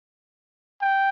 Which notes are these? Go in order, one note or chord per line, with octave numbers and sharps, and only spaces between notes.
G5